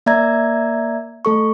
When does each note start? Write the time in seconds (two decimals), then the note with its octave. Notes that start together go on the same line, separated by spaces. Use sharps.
0.06 A#3 D5 E5 A#5 G#6
1.25 A3 A4 C#6